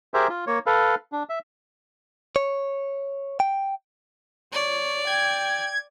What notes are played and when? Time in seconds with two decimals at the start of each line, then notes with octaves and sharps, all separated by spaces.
0.14 G4 G#4 A#4 C5 E5
0.29 F4
0.47 A#3 C#5
0.66 A4 B4 F5
1.12 D4
1.29 E5
2.36 C#5
3.40 G5
4.53 C#5 D5
5.07 G5 G#6